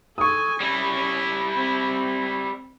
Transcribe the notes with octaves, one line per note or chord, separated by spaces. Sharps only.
A4 G#5 C#6 D#6
G3 C#4 E4
C4